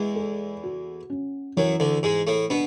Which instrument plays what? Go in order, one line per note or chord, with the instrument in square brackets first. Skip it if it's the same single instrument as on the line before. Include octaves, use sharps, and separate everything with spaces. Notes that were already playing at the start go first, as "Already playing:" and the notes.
Already playing: [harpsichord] E2 E3 [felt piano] G#3
[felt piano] A4
F#4
C#4
[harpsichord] F#2 F#3 [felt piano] E3
[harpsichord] D2 D3
[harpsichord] G#2 G#3 [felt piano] G#4
[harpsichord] A2 A3
[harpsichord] B2 B3 [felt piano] D4